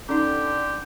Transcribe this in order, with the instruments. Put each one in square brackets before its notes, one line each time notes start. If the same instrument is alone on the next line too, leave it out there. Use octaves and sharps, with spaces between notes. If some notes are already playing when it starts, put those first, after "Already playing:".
[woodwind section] D3 [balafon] C#4 D#4 [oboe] G4